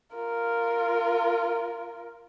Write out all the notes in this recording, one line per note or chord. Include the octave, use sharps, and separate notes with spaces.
F4 A#4